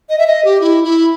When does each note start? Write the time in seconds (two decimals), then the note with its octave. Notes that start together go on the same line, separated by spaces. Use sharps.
0.09 D#5
0.18 E5
0.27 D#5
0.45 G4
0.61 E4
0.84 E4